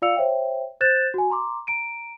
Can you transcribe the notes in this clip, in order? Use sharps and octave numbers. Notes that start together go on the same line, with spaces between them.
F4 D5 F5 E6 C#7 F7
C5 C#5 E5 G5
C5 F#6 G6 A6 E7
F#4 G#5
A#5 C6 D6
A#5 D7 D#7